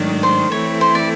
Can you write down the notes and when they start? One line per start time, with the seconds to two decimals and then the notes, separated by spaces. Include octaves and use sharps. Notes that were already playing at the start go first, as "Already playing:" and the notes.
Already playing: G#2 D#3 F#3 A3 D4
0.23 C5
0.51 E3 A3 C4 E4 A4 C#5
0.81 C5
0.95 D5